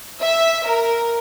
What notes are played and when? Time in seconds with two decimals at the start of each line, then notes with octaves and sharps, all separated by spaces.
0.21 E5
0.65 A#4